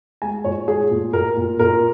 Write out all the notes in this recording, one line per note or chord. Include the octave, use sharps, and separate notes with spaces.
G#3 G#5
A#2 C#5
G#3 G#4
A#2
A#2 A#4
A#2
A#2 A#4